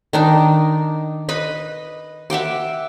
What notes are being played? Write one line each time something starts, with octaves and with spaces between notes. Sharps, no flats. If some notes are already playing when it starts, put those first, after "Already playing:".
D#3 D4 D#4
B4 D#5 B5
E5 F#5 G5 D6